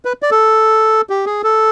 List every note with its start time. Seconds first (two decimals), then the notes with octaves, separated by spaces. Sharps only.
0.05 B4
0.22 D5
0.31 A4
1.10 G4
1.26 G#4
1.43 A4